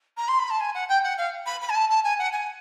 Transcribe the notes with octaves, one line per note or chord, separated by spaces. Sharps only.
A#5
C6
B5
A5
G#5
F#5
G5
F#5
F5
B5
B5
G#5
A5
A5
G#5
F#5
G#5